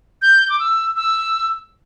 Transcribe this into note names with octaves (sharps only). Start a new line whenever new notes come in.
G6
D6
E6
E6